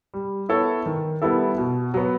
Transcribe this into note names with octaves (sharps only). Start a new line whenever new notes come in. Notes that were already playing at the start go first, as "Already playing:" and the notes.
G3
B3 E4 A4 C#5
D#3
G3 B3 E4 A4
B2
F#3 B3